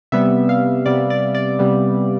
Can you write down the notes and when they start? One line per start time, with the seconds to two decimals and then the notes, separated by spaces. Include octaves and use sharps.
0.12 C3 G3 B3 E5
0.49 F5
0.86 C3 G3 B3 D5
1.10 D5
1.35 D5
1.59 C3 G3 B3